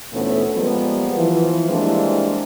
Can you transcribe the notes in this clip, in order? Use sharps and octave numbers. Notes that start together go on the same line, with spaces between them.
D2 A#2 E3 A3 B3 C#4
F3 G3 G#3 A#3 B3
E3 F3
E3 G3 G#3 A#3 C4 D4